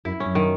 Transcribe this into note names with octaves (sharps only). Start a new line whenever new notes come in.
F#2 E4
C#4
F#2
D#3